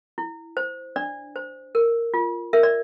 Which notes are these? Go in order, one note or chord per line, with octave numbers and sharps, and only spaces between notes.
E4
C5
D4 D5
C5
A#4
F4
A#4 E5
D5